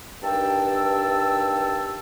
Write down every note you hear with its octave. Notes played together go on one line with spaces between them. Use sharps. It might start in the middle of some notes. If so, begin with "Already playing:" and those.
G2 D#3 G5 A5 E6